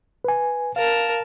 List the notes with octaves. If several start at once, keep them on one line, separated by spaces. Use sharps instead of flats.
B4 G#5
A#4 F5 A5